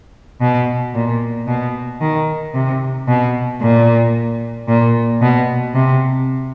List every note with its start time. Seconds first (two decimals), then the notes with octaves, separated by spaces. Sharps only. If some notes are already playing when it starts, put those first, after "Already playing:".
0.41 B2
0.94 A#2
1.47 B2
2.01 D#3
2.54 C3
3.08 B2
3.61 A#2
4.68 A#2
5.21 B2
5.74 C3